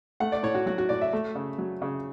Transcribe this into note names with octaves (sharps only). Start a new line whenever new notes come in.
A3 F#5
D5
A2 C#5
F#4
F#3 F#4
F#4
A2 D5
E5
A3
C#3
F#3
C#3